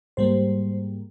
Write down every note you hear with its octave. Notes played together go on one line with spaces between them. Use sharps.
G#2 G3 A#3 C5